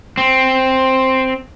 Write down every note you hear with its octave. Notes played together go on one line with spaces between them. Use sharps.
C4